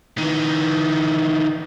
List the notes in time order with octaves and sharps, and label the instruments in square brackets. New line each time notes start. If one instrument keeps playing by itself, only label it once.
[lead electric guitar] D#3 E3